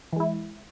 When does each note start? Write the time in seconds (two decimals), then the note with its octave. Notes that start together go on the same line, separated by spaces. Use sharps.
0.13 E3
0.16 G#3
0.20 E4